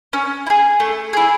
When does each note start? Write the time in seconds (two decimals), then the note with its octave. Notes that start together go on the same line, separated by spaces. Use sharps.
0.13 C#4
0.46 E4
0.50 G#4
0.80 A3
1.13 E4 G#4